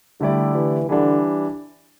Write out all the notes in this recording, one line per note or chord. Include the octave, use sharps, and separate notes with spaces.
D3 G3 A3 E4 G4 D5
E3
D3 E3 G3 D4